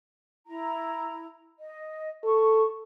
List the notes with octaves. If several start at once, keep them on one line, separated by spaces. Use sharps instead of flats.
E4 A#5
D#5
A4 C#6